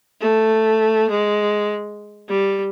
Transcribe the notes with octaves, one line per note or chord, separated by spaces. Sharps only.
A3
G#3
G3